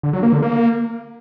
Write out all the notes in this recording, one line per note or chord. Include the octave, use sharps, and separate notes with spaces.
D3
F#3
A#3
D3
A#3